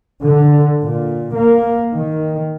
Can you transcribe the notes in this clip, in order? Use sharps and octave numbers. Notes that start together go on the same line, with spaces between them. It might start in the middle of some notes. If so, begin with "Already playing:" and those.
D3
A#2
A#3
D#3